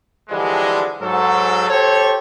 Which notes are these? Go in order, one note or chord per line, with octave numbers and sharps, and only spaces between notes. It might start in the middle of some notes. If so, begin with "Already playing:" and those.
D3 E3 F3 G3 G#3
G#2 F#3 A4
G4 A4 C5 C#5